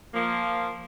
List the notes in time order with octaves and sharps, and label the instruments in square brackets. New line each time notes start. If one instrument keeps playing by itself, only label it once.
[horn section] F3 A#3